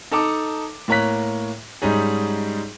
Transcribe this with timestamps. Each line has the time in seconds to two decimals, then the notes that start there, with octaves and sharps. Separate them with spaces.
0.12 D#4 A4 A5 D6
0.88 A2 A#3 C#5 A#5 F#6 B6
1.82 G#2 G3 C#4 D#4 G#4